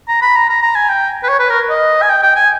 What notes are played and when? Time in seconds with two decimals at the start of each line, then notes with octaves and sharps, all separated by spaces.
0.09 A#5
0.22 B5
0.36 A#5
0.49 A#5
0.62 A#5
0.76 G#5
0.89 G5
1.23 B4
1.29 C#5
1.39 B4
1.50 A#4
1.69 D#5
2.02 G#5
2.09 G5
2.23 G5
2.36 G#5